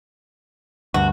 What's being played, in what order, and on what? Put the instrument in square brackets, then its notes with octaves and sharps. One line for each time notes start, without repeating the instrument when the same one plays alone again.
[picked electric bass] D2 G2 [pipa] F#4